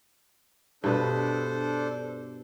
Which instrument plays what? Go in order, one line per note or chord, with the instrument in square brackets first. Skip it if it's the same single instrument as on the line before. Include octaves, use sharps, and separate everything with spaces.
[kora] G2 B2 B4 [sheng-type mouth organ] D4 A4 C5